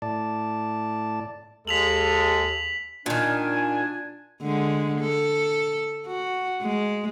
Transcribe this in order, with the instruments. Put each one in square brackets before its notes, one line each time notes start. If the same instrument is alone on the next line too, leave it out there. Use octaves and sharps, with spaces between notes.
[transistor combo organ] A2 D5 A5
[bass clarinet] D#2 [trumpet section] G#3 A4 [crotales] B6 F7 F#7
[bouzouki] A#2 D#3 [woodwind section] D4 G#5
[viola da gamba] D3 G#3
A4
F#4
G#3